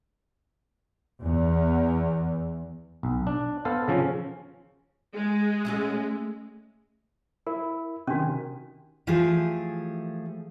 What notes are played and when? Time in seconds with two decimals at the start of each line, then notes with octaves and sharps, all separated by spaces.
1.22 E2
3.03 B1
3.27 D4
3.65 B3 A4 C5 F5
3.88 C#3 F3 C#4
5.13 G#3
5.65 A3 C#4 F#4
7.47 E4 A#4
8.07 C3 D#3 C#4 D4 F#4
9.07 E3 F3 A3 G4 G#4